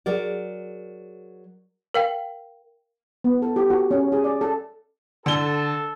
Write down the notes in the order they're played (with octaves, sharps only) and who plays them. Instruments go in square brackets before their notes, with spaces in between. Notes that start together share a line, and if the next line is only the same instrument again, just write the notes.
[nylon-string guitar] F#3 G#4 A#4 D5
[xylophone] A#4 F5 G5
[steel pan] B3
A4
G4
F#4
C#4
G#4
D5
A4
[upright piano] D3 G7 [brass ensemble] A4